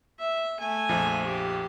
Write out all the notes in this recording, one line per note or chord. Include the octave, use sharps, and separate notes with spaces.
E5
A3 G#5
A#1 F2 F3
G4